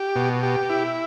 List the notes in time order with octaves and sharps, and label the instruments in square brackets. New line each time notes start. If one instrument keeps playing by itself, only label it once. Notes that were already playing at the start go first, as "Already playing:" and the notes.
Already playing: [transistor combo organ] G4
B2
G4
E4